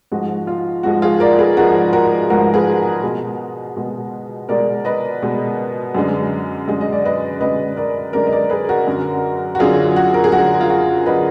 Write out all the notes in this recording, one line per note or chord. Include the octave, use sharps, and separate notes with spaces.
G#2 F3 G#3 F#4
F4
G#2 F3 G#3 F#4
F4 G#4
A#4 D5
G#4 B4
G#2 F3 G#3 F#4 A#4
F#4 A#4
G#2 F3 G#3 F#4 A#4
G#4 B4
B2 G#3
B2 G#3
B2 G#3 A#4 D5
B4 D#5
B2 G#3
F#2 D3 G#3
F#2 D3 G#3
D#5
D5
B4 D#5
F#2 D3 G#3 B4 D#5
A#4 D5
F#2 D3 G#3 A#4 D5
D#5
A#4 D5
G#4 B4
F#4 A#4
F#2 D3 F#3
F#4
F#2 D3 F#3 F4 G#4
F#4
A#4
G#4
F#2 D3 F#3 F#4
F4
F#4
D3 F#3 B4 D#5